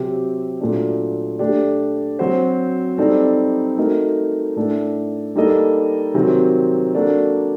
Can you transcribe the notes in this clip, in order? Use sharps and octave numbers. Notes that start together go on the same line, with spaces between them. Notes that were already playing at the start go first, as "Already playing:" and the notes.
Already playing: C3 F#3 C4 G4
A#2 F#3 A3 D4
A3 D4 G4 D5
F#3 C4 F#4 C5
G3 C4 D#4 A4 D5
A3 D#4 F#4 A#4 D#5
A2 A3 D4 A4
G3 A#3 D#4 A4 D#5
C3 D#3 F#3 C4
A#3 D4 F#4 A4 D5